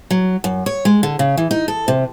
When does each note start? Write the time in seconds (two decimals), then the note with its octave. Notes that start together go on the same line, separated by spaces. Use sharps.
0.11 F#3
0.44 F#2
0.66 C#5
0.85 G#3
1.03 D3
1.19 C#3
1.37 E3
1.51 D#4
1.68 A4
1.88 C3